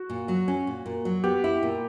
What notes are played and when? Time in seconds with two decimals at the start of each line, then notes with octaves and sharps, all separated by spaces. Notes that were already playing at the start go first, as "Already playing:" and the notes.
Already playing: F#4
0.10 A#2
0.28 F#3
0.48 C#4
0.67 A#2
0.86 A#2
1.05 F#3
1.24 B3 G4
1.44 E4
1.63 A#2